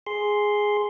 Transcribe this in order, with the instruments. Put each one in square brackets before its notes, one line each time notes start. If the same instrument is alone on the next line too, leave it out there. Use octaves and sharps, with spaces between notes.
[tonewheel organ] G#4 C6